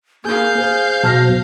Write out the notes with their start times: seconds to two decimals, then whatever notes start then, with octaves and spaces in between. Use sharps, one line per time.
0.25 A#3 G#4 F5 G6
0.58 G#4 C5
1.03 B2 F#3 A5 F6 A#6